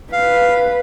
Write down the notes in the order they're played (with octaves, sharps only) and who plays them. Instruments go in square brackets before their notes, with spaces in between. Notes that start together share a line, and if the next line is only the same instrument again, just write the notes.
[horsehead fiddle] B4 [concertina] F5